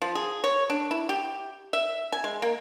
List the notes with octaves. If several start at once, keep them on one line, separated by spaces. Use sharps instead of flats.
F3
G#4
C#5
D4
E4
G4
E5
G#5
G#3
A#3